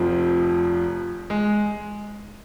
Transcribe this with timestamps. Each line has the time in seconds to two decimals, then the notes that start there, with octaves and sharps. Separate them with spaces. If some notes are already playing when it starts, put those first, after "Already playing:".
Already playing: F1 F2 F3
1.30 G#3